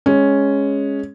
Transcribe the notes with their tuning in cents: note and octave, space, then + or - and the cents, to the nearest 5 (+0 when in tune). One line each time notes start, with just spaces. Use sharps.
G#3 +0 C#4 +0